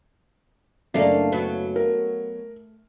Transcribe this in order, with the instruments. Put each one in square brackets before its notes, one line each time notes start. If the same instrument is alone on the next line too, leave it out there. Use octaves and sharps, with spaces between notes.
[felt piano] F#1 [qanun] A3 F5 [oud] A#3 D4
[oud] F#3 B3
[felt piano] A#4